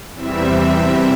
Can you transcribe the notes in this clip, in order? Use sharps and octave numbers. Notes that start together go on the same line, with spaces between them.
E2 C3 E3 G3 C4 E5